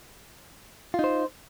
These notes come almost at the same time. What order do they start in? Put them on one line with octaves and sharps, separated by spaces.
F4 D#4 C5